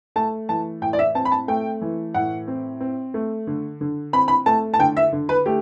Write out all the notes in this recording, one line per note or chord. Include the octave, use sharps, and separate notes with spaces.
A3 A5
E3 A5
A2 G5
D5
E5
C4 A5
B5
A5
A3 G5
E3
A2 F#5
C4
C4
A3
D3
D3
C4 B5
B5
A3 A5
A5
D3 G5
E5
D3
B4
A3 G4